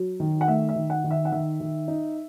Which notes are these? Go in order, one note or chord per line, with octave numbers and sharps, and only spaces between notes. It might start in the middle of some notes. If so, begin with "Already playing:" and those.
Already playing: F#3
D#3
F#5
A3 E5
E5
D#3
F#5
D#3
E5
F#5
D#3 E5
D#3
D#4